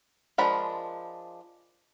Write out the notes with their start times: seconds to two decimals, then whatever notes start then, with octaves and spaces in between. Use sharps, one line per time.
0.38 F3 G#3 D4 A#4 B5